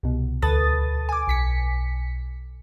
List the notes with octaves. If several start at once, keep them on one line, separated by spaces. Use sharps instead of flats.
C2 B2
D2 A4 B4 D#6 A6
G#5 D6
B1 B6 C#7